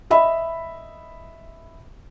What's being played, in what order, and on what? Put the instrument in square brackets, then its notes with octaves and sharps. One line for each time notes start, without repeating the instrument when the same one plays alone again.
[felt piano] D#5 E5 B5